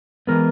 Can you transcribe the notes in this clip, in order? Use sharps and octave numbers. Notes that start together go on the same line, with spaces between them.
E3 G#3 B3 A#4